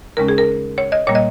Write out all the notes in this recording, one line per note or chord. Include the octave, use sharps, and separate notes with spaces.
D#2 C#3 G#3 C#4 A#4
G#4
A#4
C#5
D#5
A#2 G3 A#3 C#5
D#5